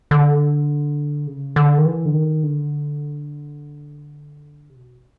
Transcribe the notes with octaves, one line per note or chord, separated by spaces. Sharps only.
D3
C#3
D3
D#3
E3
D3
D#3
D3
C3
B2